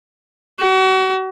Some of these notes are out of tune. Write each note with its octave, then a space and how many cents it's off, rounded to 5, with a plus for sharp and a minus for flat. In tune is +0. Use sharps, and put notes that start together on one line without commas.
F#4 +35